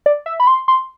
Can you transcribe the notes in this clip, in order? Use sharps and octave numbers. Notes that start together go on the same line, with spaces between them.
D5
E5
B5
C6
C6